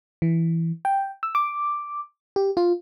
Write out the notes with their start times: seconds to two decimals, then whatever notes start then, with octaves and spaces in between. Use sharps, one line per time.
0.22 E3
0.85 G5
1.23 E6
1.35 D6
2.36 G4
2.57 F4